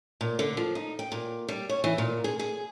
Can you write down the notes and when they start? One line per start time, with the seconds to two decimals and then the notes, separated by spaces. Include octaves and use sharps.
0.21 A#2
0.39 D3
0.57 F3
0.75 D#4
0.99 G5
1.12 A#2
1.49 G3
1.69 C#5
1.84 E3
1.98 A#2
2.24 G#4
2.39 G#4